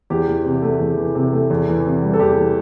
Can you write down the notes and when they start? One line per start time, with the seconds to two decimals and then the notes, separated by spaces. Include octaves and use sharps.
0.10 E2 G4
0.28 E3
0.45 C3
0.62 A3
0.80 E2
0.97 E3
1.15 C3
1.33 A3
1.50 E2
1.68 E3
1.85 C3
2.03 G3
2.13 A4
2.20 E2 G4
2.38 E3